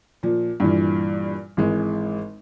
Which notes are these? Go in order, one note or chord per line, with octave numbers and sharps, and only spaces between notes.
A#2 F3
G2 A#2 E3
G#1 E3 G#3